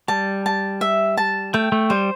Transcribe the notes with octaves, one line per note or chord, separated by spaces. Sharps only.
G3 A5
A5
E5
A5
A3 G5
A3
G3 C5